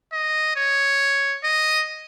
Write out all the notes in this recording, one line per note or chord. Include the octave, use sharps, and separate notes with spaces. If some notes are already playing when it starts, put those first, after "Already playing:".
D#5
C#5
D#5